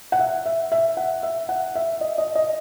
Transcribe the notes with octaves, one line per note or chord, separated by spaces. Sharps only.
F#5
E5
E5
E5
F#5
E5
F#5
E5
D#5
D#5
D#5